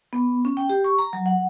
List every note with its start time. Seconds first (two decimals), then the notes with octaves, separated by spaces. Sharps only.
0.13 B3
0.45 C#4
0.57 G5
0.69 G4
0.84 C#6
0.99 A#5
1.13 F#3
1.26 F#5